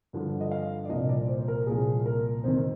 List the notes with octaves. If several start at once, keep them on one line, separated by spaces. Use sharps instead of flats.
G2 D3 F3
D#5
F5
D5
C2 A#2 F3 D#5
D5
C5
C5
A#4
C2 A#2 F3 G#4
A#4
F2 C3 D#3 C5